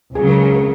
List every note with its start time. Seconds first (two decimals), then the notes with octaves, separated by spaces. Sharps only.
0.15 C#2 C#3 F#3 G#4
0.29 A#4
0.41 G#4
0.55 A#4